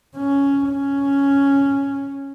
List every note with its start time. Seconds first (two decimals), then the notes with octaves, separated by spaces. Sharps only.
0.17 C#4
0.69 C#4